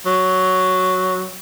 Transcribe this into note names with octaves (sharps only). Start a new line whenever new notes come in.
F#3